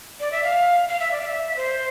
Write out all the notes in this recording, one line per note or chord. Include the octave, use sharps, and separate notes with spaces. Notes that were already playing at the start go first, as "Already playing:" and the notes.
D5
E5
F5
F5
E5
D5
F5
E5
C5